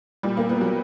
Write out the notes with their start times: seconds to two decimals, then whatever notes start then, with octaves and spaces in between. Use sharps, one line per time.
0.23 A#2 G3
0.37 A#3
0.49 B3
0.61 F#3